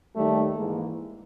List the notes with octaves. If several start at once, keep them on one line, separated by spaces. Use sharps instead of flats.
D#2 D#3 G3 A3
G#2 E3 G#3 A#3